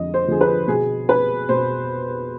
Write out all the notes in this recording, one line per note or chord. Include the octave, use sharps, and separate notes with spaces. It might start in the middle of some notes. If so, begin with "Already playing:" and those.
Already playing: F2 D3 F3 D#5
C5
D3 F3 G#4
B4
B2 G#4
B4
B2 C5